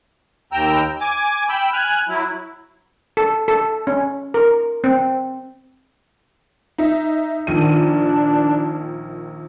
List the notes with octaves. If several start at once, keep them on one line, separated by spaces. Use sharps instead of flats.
D#2 G5 A#5 E6
G#5 D6
G5 B5 E6
G#5 F6 F#6
F#3 E4
A4
A4
C#4
A#4
C4
D#4 E5
A#1 D#3 D4 D#7